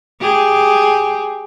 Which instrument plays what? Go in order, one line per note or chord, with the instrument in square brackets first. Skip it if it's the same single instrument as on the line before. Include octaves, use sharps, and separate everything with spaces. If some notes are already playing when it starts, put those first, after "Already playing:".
[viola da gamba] G4 G#4